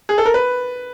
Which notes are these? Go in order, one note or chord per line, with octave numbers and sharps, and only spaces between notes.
G#4
A4
A#4
B4